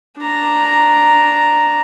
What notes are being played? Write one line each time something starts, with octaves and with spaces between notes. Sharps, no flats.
D4 A#5